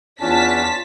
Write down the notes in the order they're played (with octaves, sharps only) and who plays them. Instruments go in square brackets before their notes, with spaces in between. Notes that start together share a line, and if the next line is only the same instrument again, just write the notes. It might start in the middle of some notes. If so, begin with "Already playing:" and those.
[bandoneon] E2 C#4 D4 [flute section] F4 [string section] A5 B6